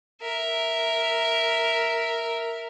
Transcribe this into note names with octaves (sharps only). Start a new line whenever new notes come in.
A#4 E5